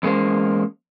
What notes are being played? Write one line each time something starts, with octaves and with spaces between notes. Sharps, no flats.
E2 D3 G#3 A#3 C#4 C5